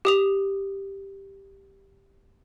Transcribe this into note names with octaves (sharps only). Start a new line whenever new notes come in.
G4 D#6 F7